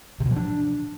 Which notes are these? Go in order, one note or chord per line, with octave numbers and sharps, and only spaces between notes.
C3
B2
F3
D4